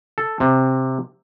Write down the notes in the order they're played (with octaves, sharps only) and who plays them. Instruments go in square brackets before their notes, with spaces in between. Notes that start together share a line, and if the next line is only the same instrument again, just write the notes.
[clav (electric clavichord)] A4
C3